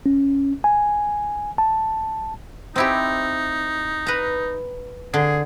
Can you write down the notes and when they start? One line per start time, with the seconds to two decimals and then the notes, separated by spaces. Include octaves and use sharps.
0.06 C#4
0.64 G#5
1.58 A5
2.76 C4 D#4 E4 G4
4.06 B4 A#5
5.14 D3 G#4